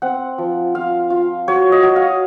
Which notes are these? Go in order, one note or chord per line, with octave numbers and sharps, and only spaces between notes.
C4 F#5
F3
F4 F5
F4
F#3 C#5
D#5
F#3
F5